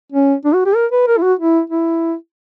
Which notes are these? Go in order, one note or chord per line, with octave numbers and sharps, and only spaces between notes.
C#4
D4
F#4
G4
A#4
B4
A#4
E4
F#4
E4
E4